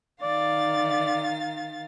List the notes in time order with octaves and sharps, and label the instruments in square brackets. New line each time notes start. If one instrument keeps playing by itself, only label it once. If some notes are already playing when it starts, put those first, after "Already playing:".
[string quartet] D#3 F5 A6 [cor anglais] D5